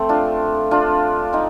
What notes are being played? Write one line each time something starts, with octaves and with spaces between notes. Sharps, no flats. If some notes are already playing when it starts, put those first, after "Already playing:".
Already playing: A3 C4
D4 F4
D4 F4
C4 D#4